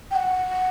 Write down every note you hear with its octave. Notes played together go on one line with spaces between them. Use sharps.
G5
F#5